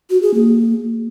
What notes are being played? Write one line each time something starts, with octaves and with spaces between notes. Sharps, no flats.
F#4
G#4
A#3